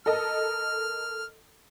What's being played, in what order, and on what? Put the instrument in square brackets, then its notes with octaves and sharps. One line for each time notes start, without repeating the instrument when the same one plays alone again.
[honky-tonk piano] A4 A#4 D#5 [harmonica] F6